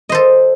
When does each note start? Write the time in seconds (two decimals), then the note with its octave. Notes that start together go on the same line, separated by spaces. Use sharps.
0.09 D#5
0.12 C5
0.15 A4